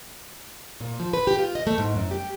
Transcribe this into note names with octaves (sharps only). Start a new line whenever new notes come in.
A#2
F3
B4
G4
F4
D#5
A3
G#2
F#2
G4